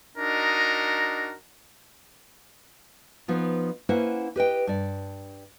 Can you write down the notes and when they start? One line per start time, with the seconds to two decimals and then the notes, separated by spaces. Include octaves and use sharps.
0.17 D4 D#4 F#4 A#4 D#5
3.28 F3 B3 D#4 F4
3.89 A#3 C#4 E4 B4 C5 F#5
4.36 G4 B4 D#5 G5
4.67 G2 D5